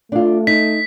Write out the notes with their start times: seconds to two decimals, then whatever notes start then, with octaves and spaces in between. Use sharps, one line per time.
0.12 A3 D4 F4
0.47 D#4 B6